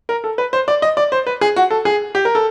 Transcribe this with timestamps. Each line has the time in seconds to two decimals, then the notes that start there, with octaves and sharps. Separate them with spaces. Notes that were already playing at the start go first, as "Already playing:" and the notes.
0.09 A#4
0.24 A4
0.38 B4
0.53 C5
0.68 D5
0.82 D#5
0.97 D5
1.12 C5
1.27 B4
1.41 G#4
1.56 F#4
1.71 A4
1.85 G#4
2.15 G4
2.25 A#4
2.35 A4